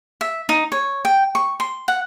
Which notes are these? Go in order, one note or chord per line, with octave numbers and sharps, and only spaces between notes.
E5
D#4
C#5
G5
C#6
C6
F#5